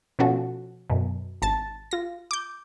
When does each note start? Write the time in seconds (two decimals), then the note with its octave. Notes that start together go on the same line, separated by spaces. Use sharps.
0.19 B2 F3 C#4 F#4 A4
0.90 F#2 B2
1.42 G#1 A5 A6
1.91 F4 A#6
2.31 D6 G6